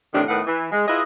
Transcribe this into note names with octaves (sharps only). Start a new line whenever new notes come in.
A2 C3 D#3 E3 D4 G4
A2 D#3 A3 B3 B4 F#5
E3
G#3
E4 F4 G#4 B4 D#5